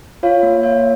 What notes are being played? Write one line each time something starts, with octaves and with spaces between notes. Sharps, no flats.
F4 C#5 F5
A#3
A#3 C#5